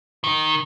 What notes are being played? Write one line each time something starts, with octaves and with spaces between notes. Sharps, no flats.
D#3